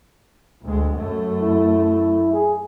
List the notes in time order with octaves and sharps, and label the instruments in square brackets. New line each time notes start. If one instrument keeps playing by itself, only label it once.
[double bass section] D2 G#3
F#2 A3
[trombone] E4
G#4